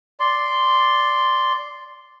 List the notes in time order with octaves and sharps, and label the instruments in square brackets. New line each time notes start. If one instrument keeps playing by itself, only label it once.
[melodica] D5 C6